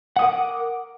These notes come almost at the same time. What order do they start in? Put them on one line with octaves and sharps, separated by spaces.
F#5 D#6 A#4 D6